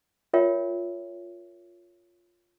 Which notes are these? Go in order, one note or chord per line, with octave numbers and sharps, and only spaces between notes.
F4 A#4 C#5 E5 G5